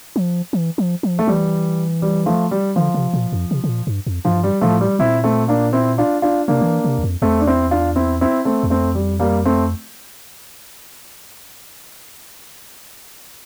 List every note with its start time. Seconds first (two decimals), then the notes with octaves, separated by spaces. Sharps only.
0.16 F3
0.53 E3
0.78 F3
1.03 F3
1.19 A3
1.27 E3 G3
2.02 G3
2.26 F3 A3
2.51 G3
2.76 D3 F3
2.94 C3
3.13 A#2
3.32 F2
3.51 C3
3.64 C3
3.69 A#2
3.87 G2
4.07 F2
4.25 G2 F3
4.43 G3
4.61 A2 F3 A3
4.81 G3
4.99 A#2 C4 E4
5.24 A3 C4
5.48 A#3 D4
5.73 C4 E4
5.98 D4 F4
6.22 D4 F4
6.48 C3 A#3 D4
6.61 D3
6.66 E3
6.84 C3
6.98 E2
7.04 F2
7.22 E2 A3 C4
7.41 D4
7.47 C4 E4
7.71 D4 F4
7.96 C4 E4
8.21 C4 E4
8.45 A3 C4
8.63 E2
8.70 F2 A3 C4
8.95 G3
9.20 G3 A#3
9.45 A3 C4